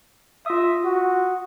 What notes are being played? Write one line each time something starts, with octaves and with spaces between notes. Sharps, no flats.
F4 E5 D#6
F#4